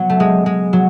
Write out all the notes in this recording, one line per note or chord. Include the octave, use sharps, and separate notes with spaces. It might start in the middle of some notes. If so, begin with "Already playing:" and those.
Already playing: F#3 B3
A3
G#3
G#3
F#3